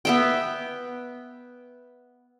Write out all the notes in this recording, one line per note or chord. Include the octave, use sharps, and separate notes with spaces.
B3 E5 G5